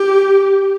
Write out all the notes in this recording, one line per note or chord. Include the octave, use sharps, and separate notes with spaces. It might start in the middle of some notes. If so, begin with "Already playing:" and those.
Already playing: G4